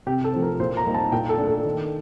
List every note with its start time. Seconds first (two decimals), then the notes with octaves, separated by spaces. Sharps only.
0.07 C3 G4
0.24 A4
0.33 F3 A3 C4
0.42 A#4
0.60 A#2 C5
0.77 A#5
0.86 G3 A#3 D#4
0.95 A5
1.12 A#2 G5
1.29 A4
1.38 A3 D4
1.47 A4
1.65 D#3